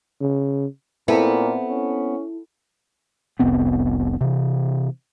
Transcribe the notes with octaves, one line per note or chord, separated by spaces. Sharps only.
C#3
A#2 B3 C4 E4 A4
C#4
F1 C2 B3 C4
C3 E3